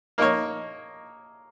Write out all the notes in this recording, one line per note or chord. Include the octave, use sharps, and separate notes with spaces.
A#3 D#4 A#4 C#5